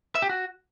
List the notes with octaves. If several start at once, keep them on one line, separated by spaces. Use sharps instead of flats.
E5
G4
F#4